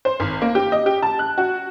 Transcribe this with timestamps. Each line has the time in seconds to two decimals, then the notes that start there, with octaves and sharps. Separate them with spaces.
0.05 C5
0.20 G#1
0.42 A#3
0.55 G4
0.72 D#5
0.86 G4
1.03 A5
1.19 F#6
1.38 F#4